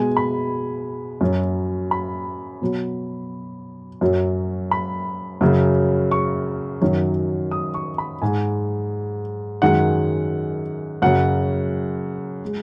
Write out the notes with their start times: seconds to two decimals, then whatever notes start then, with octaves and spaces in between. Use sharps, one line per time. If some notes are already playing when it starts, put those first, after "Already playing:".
Already playing: B2 G#3 G#5
0.17 B5
1.21 F#2 F#3
1.91 B5
2.62 B2 F#3
4.01 F#2 F#3
4.71 B5
5.41 F#2 C#3 F#3
6.11 C#6
6.81 F#2 D#3 F#3
7.51 D#6
7.74 C#6
7.98 B5
8.22 G#2 G#3 G#5
9.62 F#2 D#3 G#3 F#5
11.02 F#2 C#3 F#3 F#5
12.45 G#3